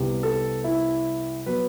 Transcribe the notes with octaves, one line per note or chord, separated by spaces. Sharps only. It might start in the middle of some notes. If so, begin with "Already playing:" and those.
Already playing: C2 C3 G3 B3
A4
E4
F#3 B3 B4